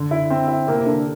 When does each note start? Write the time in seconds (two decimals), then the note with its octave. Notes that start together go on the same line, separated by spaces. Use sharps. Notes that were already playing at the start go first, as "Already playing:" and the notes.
Already playing: D3
0.11 E4
0.30 C4
0.48 E4
0.67 C3 A#3
0.86 D3